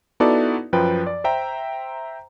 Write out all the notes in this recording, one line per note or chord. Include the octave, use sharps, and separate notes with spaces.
B3 D#4 E4 F#4 A4 D5
F#2 F3 B4 G5
D5
C5 E5 G5 A#5